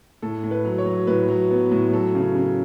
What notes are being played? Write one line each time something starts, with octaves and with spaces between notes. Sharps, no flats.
A2 A4
A2
B4
F#3
C#5
F#3
A2 B4
F#3
B3
A2
F#3 A4
C#3
C#3